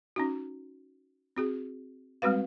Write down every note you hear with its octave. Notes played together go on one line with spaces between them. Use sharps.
C#4 D#4 F#4
C4 F#4 G#4
G3 G#3 C4 F#4 B4 F5